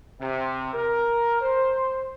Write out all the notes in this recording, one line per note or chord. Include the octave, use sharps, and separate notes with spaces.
C3
A#4
C5